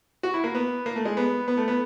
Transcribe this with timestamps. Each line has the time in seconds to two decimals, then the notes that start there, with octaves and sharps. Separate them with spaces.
0.23 F#4
0.34 E4
0.44 A#3
0.55 B3
0.86 A#3
0.96 A3
1.05 G#3
1.17 B3
1.48 B3
1.57 A3
1.68 B3